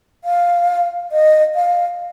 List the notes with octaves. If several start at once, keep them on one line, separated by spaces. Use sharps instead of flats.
F5
D#5
F5